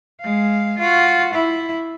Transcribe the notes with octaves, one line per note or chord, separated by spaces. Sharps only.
G#3 F5
F4 F#4
E4